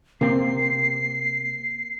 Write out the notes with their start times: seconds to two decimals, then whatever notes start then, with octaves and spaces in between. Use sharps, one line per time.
0.21 C3 A#3 C4 C7